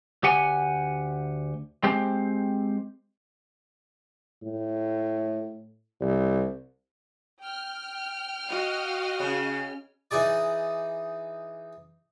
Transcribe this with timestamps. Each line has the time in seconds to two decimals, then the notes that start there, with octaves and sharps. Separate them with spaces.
0.23 D2 G4 F#5 G#5
1.83 G#3 C4 G4 C5
4.43 A2
6.01 C2
7.42 G5 F6
8.46 F#4 D#5 F5
9.20 C#3
10.11 E3 D#4 G#4 D5